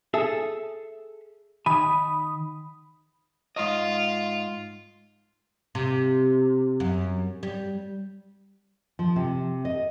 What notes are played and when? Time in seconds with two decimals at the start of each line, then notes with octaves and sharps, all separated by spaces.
0.14 G#4 A4 E5
1.66 D#3 G#5 B5 D#6
3.56 G#2 F4 D#5
5.75 C3
6.80 F#2
7.43 G3
8.99 F3
9.16 C3
9.65 D#5